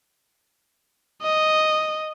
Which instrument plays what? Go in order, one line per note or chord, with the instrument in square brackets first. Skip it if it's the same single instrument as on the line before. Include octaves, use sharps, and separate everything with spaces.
[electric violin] D#5